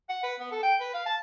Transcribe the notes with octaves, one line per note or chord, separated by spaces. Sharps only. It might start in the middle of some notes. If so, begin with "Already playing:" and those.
F#5
B4
B3
A4
G5
B4
F5
A5